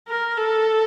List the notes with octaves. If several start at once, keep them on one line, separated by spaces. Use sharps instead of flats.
A#4
A4